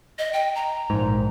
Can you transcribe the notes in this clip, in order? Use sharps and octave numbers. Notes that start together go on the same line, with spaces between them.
D#5
G5
A#5
A#1 G#2